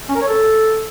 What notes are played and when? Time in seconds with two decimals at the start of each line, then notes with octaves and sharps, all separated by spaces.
0.09 C#4
0.15 A#4
0.21 C#5
0.28 A4